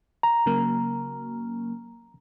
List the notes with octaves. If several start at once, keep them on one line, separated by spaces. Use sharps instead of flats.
A#5
C#3 F#3 A#3